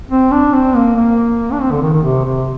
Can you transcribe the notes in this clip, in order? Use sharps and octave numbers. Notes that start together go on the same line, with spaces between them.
C4
D4
C4
A#3
A#3
D4
C4
D3
D#3
D#3
C3
C3